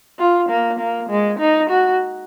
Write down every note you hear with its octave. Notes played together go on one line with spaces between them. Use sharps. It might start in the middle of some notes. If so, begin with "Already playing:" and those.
F4
A#3
A#3
G#3
D#4
F#4